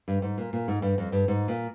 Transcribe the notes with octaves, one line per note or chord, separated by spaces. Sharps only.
G2
G#2
A#2
A#2
G#2
G2
F2
G2
G#2
A#2